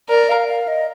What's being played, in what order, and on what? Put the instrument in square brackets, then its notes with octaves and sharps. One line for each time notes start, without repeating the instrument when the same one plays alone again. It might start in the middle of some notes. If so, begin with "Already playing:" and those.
[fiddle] A#4 [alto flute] D5
[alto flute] F5
F5
D#5